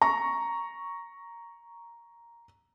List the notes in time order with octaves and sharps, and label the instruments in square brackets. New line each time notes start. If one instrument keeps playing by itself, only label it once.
[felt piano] A#5 C#6